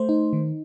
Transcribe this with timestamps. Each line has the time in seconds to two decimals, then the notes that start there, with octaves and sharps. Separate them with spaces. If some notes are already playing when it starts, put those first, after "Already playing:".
Already playing: A3 C5
0.09 D#4
0.33 D#3